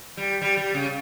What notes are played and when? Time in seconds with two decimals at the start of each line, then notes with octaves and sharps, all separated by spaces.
0.17 G3
0.42 G3
0.57 G3
0.74 C#3